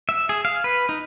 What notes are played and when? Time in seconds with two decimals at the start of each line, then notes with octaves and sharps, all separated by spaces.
0.09 E5
0.29 G#4
0.45 F5
0.64 B4
0.89 D#4